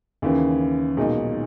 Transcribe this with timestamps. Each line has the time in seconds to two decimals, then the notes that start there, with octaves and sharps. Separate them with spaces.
0.22 D#2 C#3 E3
0.97 B1 A#2 G#3 D#4